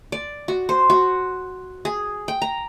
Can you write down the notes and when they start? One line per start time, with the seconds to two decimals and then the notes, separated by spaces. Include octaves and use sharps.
0.12 D5
0.48 F#4
0.69 C5
0.90 F#4
1.85 G#4
2.28 G5
2.42 A#5